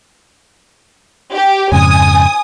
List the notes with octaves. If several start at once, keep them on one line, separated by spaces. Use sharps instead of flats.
G4
F2 G#2 C#3 G#5 D#6